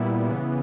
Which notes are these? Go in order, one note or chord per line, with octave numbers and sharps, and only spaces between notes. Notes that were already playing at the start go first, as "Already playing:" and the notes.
Already playing: A#2 G3 B3 E4
C#3 E3 B3